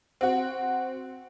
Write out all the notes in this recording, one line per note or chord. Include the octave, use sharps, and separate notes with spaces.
C4 F#4